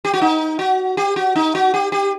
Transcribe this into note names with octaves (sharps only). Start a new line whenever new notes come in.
G4
F#4
D#4
F#4
G4
F#4
D#4
F#4
G4
G4